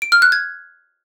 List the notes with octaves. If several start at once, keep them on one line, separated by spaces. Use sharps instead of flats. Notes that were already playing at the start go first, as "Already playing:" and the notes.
D7
F6
F#6
G#6